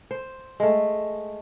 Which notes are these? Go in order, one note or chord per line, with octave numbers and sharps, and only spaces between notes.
C5
G#3 A3